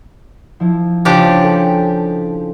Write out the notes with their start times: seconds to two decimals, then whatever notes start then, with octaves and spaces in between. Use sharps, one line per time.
0.60 F3 E4
1.05 C#3 F3 D4 G4
1.43 G#4 A4 G5